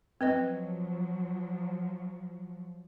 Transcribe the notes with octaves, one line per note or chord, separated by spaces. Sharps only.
F3 F#3 C4 B4 D#5